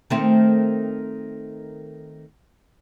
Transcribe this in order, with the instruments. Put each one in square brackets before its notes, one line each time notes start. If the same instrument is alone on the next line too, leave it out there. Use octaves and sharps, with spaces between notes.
[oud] D#3 A3 C4